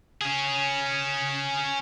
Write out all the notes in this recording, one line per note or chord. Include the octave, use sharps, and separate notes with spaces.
C#4 G#4